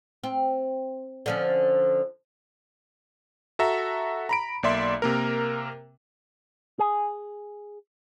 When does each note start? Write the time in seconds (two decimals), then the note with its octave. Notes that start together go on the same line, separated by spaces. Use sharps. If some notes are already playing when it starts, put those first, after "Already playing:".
0.24 C4
1.26 D3 F3 C#4
3.59 F#4 A4 E5 A#5
4.29 A#5 B5 D7
4.63 B1 A#3 D5 E5 C6
5.02 C3 A#3 A#4
6.79 G#4